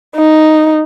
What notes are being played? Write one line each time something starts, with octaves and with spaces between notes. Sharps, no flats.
D#4